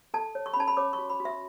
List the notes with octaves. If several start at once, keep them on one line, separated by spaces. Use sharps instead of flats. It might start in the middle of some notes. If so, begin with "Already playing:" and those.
A4 A5
C#5
C#6
B5
C#4 A5
B5
C#5 D6
C#6
F#4
B5
F#4
E5